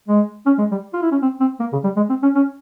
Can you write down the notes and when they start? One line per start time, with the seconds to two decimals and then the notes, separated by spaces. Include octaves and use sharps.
0.08 G#3
0.46 C#4
0.58 G#3
0.71 G3
0.93 F4
1.02 E4
1.11 C#4
1.22 C4
1.40 C4
1.60 A#3
1.72 C#3
1.84 G3
1.96 G#3
2.09 C4
2.22 C#4
2.35 C#4